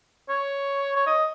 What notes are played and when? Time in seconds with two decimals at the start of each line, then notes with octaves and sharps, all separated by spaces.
0.29 C#5
0.96 C#5
1.06 D#5